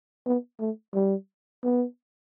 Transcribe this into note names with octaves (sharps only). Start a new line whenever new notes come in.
B3
A3
G3
B3